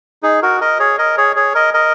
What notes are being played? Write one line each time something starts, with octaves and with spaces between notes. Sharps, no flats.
D#4 G#4
F#4 A#4
A#4 D#5
G#4 C#5
A#4 D#5
G#4 C#5
G#4 C#5
A#4 D#5
A#4 D#5